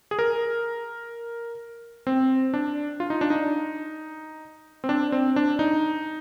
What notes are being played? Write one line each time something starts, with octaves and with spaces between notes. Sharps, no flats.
G#4
A#4
C4
D4
F4
D#4
D4
D#4
C4
D4
C4
D4
D#4